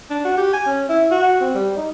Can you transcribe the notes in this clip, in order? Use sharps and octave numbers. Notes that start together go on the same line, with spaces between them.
D4
F#4
G4
G#5
C#4
E4
F#4
C4
G3
D#4